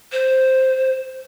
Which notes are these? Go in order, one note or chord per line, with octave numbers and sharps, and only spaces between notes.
C5